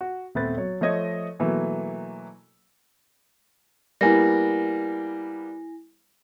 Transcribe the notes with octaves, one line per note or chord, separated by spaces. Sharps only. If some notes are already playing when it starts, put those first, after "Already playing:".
F#4
D#1 A3 B3 C4 B4 A6
F#3 C#5
F3 A3 C#5 D#5 G#6
B2 E3 F#3 A3 A#3
G3 A#3 B3 E4 G#5 A#6